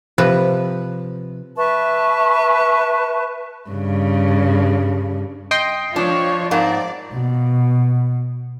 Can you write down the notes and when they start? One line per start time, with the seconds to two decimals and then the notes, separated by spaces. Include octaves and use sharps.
0.18 C3 F3 B4
1.57 B4 E5 A5 C#6
3.70 G2 C#3
5.51 D#5 G5 C6
5.96 F3 D4 F4 C#5
6.51 G#2 A#3 C4 D5
7.12 B2